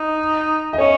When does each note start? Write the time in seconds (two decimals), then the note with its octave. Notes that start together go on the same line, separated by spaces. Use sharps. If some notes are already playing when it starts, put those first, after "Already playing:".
Already playing: D#4
0.73 D#5
0.78 C#4 C#5